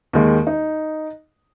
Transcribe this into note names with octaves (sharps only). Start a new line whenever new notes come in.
D#2 D#3 G#3
D#4